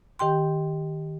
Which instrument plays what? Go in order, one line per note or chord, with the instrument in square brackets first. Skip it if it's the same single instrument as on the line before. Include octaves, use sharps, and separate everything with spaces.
[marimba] D#3 G4 G5 C6